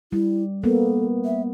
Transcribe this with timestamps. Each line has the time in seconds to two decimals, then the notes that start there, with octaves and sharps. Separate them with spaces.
0.12 G3 E4
0.64 A#3 B3 A4
1.25 E5